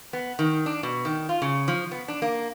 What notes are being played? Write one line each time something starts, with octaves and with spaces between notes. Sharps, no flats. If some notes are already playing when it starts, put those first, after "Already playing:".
B3
D#3
D4
B2
D#3
F4
C#3
F3
B3
D4
A#3